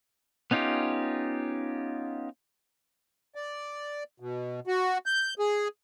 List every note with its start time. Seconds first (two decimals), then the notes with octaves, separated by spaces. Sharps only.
0.51 B3 C#4 D#4 F4 G4
3.35 D5
4.20 B2
4.67 F#4
5.06 G6
5.39 G#4